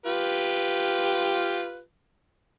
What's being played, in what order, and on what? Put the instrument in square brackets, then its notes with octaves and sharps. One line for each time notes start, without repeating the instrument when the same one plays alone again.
[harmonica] F4 G4 B4